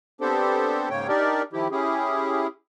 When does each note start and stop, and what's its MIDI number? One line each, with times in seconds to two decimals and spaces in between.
0.21 0.89 59
0.21 0.89 60
0.21 0.89 62
0.21 0.89 67
0.21 0.89 69
0.21 0.89 72
0.90 1.07 44
0.90 1.07 49
0.90 1.07 58
0.90 1.07 73
0.90 1.07 79
1.08 1.42 62
1.08 1.42 63
1.08 1.42 67
1.08 1.42 70
1.08 1.42 74
1.53 1.68 51
1.53 1.68 53
1.53 1.68 64
1.53 1.68 67
1.71 2.47 61
1.71 2.47 64
1.71 2.47 67
1.71 2.47 68